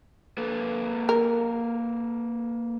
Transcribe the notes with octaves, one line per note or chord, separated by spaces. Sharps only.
A#3 A4 B4
A#4